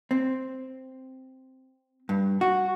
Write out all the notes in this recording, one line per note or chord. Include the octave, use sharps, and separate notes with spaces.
C4
G2
F#4